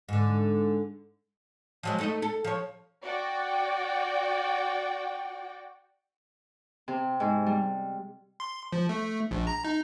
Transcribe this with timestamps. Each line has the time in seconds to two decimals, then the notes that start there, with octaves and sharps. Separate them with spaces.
0.09 G#2 D3
1.83 F3 F#3 G#3
1.99 A3 D#4 D#5
2.22 A4
2.44 F3 C#5
3.03 F#4 D5 F#5 G5
6.88 C3
7.20 G#2
7.46 G3
8.40 C6
8.72 F3
8.89 A3
9.31 A#1
9.47 A#5
9.65 D#4